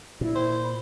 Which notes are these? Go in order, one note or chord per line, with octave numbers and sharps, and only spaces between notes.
A#2 E4
C5
B5